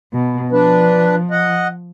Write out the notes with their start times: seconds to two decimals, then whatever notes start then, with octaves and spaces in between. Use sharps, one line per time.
0.13 B2
0.52 F3 D4 B4
1.31 D#5 F#5